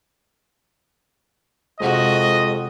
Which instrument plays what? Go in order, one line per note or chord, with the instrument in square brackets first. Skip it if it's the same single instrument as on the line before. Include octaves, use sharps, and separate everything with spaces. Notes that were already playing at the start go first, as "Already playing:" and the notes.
[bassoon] F2 [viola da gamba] C3 F#4 [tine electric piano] G#3 G#4 F#5 [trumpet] D#5